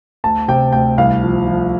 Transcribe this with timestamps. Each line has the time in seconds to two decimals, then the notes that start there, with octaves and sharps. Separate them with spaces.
0.24 D2 A5
0.48 C3 G5
0.72 D2 G5
0.98 C2 F5
1.23 F3
1.48 F3